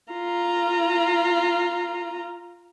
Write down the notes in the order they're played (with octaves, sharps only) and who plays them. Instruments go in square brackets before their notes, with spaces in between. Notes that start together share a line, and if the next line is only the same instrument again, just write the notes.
[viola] F4 A#5